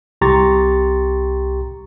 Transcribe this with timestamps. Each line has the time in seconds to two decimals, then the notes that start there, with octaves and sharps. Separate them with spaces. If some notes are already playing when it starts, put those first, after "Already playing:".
0.21 C2 G4 A#5 C6 C#6 A6